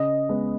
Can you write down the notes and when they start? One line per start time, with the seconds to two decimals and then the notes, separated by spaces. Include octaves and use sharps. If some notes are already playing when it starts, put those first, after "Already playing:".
Already playing: C#3 D#5
0.29 G#3 B3